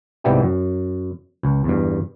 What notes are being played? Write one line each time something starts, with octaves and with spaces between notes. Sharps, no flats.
C2 G#2 G3 B3 E4 G4
F#2
C#2
E2 G2